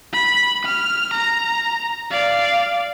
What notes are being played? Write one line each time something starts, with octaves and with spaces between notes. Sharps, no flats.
B5
F6
A#5
D5 F5